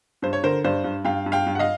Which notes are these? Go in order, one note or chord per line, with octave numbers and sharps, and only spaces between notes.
G2 C5
C#5
D3 A#4 C5
G2 C5 D5
G2
G2 F5 G5
G2
F5 G5
G2
F#5
D#5 F5